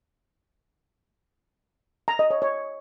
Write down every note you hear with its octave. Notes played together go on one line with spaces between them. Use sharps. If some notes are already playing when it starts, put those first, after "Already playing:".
A#5
D#5
C#5
C#5